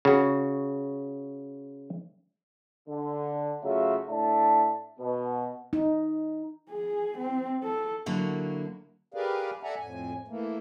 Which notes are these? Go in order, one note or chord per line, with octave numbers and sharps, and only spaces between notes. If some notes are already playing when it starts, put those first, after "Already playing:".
C#3 F#4
D3
C#3 F#3 A3 F4 F#4 E5
A2 D4 E5 A5
B2
D#4
G#4
C4
A4
D3 F#3 A#3 E4 F#4
G4 G#4 A#4 B4 D5 F5
A4 D5 E5 F#5 G#5 A#5
F2 A2 G#5
E3 A3 A#3